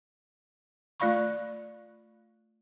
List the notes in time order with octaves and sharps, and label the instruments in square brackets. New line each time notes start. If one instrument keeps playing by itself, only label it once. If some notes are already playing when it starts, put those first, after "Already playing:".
[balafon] A3 F4 D5 F5 B5 C#6